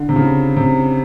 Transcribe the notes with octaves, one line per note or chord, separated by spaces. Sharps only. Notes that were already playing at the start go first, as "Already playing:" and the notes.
Already playing: D3
C3
C#3
C3